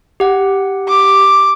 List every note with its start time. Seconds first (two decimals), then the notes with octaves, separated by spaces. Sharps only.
0.20 G4 F#5
0.88 D6